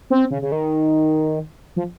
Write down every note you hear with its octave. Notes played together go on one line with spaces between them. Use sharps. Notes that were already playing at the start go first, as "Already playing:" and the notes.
C4
C#3
C#3
D#3
F3